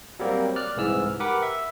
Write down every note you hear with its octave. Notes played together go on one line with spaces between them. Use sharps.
F#3 G3 A#3 C4
D5 F6 F#6
C2 G#2 E3 E6 F6
G4 A#4 B4 F#5 D6
E5